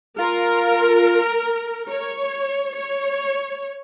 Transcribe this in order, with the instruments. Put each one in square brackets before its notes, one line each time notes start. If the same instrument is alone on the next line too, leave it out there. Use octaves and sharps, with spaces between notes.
[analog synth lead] F4 [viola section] A#4
[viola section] C#5
C#5